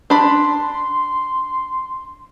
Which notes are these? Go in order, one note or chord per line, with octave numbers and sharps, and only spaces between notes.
D4 B5 C6